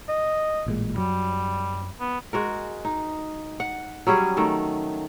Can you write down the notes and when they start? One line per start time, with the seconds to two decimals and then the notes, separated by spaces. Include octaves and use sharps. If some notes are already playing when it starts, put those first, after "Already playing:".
0.09 D#5
0.67 A1 A#2 G#3
0.97 F#2 F#3 G3
2.00 B3
2.33 G#3 F#4 A#4
2.85 D#4
3.60 F#5
4.07 F#3 G3 C#4 G#4
4.37 D#3 A3